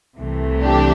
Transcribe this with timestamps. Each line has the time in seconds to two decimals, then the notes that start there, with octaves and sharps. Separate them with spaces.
0.18 C2 C3 E3 A3
0.62 D4 G4